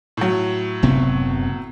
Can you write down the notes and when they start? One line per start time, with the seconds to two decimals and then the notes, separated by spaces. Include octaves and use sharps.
0.17 A2 F#3
0.83 F#1 C3 B3